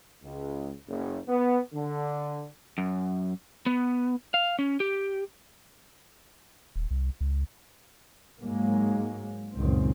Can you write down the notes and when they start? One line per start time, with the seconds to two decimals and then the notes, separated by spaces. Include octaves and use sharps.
0.23 C#2
0.88 F#1
1.28 B3
1.73 D3
2.78 F#2
3.66 B3
4.34 F5
4.59 C#4
4.80 G4
6.76 D#1
6.91 C2
7.21 C#2
8.41 G#2 F#3 G#3 A#3
9.57 C#2 F#2 A#2 D#3 C4